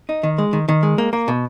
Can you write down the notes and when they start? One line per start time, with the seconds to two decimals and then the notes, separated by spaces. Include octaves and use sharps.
0.09 D#4
0.23 D#3
0.38 G#3
0.53 D#3
0.68 D#3
0.83 G#3
0.98 A#3
1.13 A#3
1.28 B2